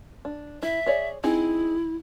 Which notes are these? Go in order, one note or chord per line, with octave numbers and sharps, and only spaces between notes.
D4
E4 E5
G#4 C#5 D5
C4 D#4 E4 G#4